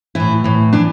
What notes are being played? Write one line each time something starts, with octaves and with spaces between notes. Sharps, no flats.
A2 E3 E4
A2 E3
E3 D4